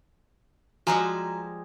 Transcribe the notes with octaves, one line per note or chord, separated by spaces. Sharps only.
F3 G3 G#3 F#4 G#5 A#5